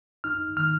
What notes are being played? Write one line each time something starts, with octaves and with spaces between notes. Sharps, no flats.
D#4 F6
D#3 F6